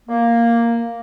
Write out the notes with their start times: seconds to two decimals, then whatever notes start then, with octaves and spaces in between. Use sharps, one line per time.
0.08 A#3